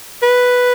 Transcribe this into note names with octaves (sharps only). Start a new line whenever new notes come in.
B4